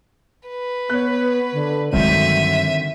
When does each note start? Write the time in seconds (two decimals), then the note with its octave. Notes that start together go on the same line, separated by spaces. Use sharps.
0.48 B4
0.90 B3 C#5 F#6
1.53 D3
1.93 G2 D3 D#3 F#3 G#3 C4 E5 D#7